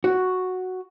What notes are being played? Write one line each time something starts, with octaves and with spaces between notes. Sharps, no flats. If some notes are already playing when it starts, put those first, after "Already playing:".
F#4